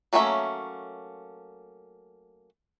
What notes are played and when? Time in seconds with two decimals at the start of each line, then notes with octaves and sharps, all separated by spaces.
0.13 F#3 A3 A#3 C#4 E5